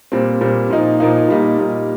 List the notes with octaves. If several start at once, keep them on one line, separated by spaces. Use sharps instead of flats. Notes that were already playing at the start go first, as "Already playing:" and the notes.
A#2 G3 C4
A#2 G3 C4
A#2 F3 A#3 D#4
A#2 F3 A#3 D#4
A#2 G3 D#4
A#2 G3 D#4